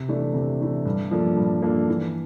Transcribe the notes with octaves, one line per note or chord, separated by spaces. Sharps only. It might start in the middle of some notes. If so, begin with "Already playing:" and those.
Already playing: C3
E3 A3 D4
C3
E3 A3 D4
G2
F3 A#3 D4 A4
G2
F3 A#3 D4 A4
E3